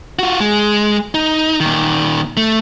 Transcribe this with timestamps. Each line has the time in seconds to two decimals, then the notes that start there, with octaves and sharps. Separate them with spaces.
0.19 F4 F#4
0.40 G#3
1.14 D#4
1.60 A#2 D#3
2.37 A3